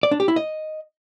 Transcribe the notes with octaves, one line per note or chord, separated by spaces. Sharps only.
D5
D4
G4
E4
D#5